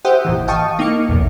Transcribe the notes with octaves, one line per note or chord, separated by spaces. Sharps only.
G4 C5 E5 F#5 G5 D#6
G#1 A#2 E3
D#5 F5 G5 A5 C#6 D#6
A#3 D#4 D6 F6 C#7
B1 E2